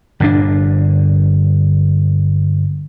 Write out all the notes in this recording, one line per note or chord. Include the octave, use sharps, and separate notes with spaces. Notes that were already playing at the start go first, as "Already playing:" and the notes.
G1 A#2 C#3 D4